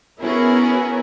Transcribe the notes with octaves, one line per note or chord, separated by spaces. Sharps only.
B3 C#4 E4 F#4 G#4 A#4